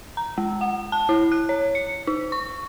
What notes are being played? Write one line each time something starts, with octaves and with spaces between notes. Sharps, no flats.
A#5
G#3
F#5
A5
E4
F#6
C#5
C#7
D#4
C#6